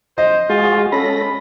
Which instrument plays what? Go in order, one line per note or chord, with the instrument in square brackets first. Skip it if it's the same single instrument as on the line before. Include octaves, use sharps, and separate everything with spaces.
[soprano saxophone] C5 [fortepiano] D#5
[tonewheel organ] G#3 F#4 G#4 [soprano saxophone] F4
[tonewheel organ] C#4 A4 A#6 [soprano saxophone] B5